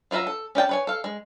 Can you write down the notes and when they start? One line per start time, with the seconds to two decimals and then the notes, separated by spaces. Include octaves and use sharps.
0.11 F#3 F4 B4 E5 A#5
0.27 A4
0.55 C#4 D5 G5 A5
0.69 B4 C#5 G#5
0.87 A4 F5
1.04 G#3